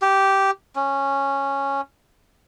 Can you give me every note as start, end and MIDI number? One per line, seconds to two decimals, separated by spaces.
0.02 0.51 67
0.76 1.81 61